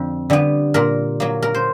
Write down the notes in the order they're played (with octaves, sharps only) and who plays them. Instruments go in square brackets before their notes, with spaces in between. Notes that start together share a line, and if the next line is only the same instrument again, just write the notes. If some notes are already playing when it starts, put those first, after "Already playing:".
Already playing: [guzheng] F2 D3
D3 G3 B3
A#2 A#4
F#3 A#3
A#4
C5